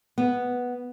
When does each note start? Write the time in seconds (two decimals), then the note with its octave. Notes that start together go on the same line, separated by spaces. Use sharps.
0.18 B3